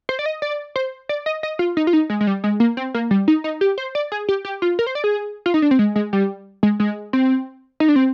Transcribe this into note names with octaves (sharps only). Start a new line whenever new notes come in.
C5
D5
D#5
D5
C5
D5
D#5
D#5
F4
D#4
F4
D#4
G#3
G#3
G3
G#3
A#3
C4
A#3
G3
D#4
D#4
G4
C5
D5
G#4
G4
G4
F4
A#4
C5
D5
G#4
F4
D#4
D4
C4
G#3
G#3
G3
G#3
G#3
C4
D#4
D4
C4